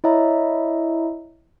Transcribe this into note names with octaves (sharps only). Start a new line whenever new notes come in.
E4 C#5 D#5 E5 A#5